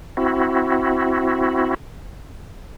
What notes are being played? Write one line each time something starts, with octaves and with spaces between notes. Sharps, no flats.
C4 E4 F#4